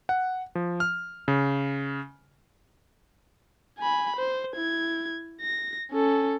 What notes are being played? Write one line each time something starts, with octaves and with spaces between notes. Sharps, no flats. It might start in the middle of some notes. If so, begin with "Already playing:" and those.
F#5
F3
F6
C#3
G#5 B5
C5
E4 G#6
A#6
C#4 A4